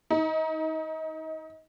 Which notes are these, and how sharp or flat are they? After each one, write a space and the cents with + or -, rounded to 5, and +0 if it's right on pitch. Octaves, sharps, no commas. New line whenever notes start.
D#4 +25